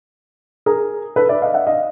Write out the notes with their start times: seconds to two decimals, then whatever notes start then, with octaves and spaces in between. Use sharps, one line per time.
0.66 G#4 A#4
1.16 A4 B4
1.29 D5 E5
1.42 D#5 F5
1.54 E5 F#5
1.67 D#5 F5